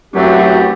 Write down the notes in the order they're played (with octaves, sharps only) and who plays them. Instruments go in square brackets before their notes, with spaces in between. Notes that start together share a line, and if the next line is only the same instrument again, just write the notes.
[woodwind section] F#2 E3 A3 C4 G4 [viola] F#3